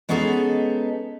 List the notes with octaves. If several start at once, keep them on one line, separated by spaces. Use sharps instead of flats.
G#3 B3 C#4 D#4 G#4 A4